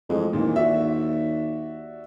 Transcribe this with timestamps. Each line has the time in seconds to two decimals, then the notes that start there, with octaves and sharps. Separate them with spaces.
0.09 F2 E3 G#3 A3
0.33 D#2 A#2 D#3 E3
0.56 F#4 D5 E5